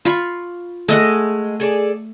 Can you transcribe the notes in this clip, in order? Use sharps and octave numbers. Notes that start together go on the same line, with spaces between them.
F4 B5 C#6
G#3 A3 D#5 F#5
G#4 A4 D5